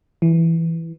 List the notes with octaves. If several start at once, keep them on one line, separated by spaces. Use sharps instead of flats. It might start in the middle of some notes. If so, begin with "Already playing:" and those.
E3